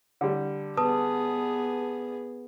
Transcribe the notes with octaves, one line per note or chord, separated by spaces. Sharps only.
D3 G3
B3 G#4 B4 A5 D#6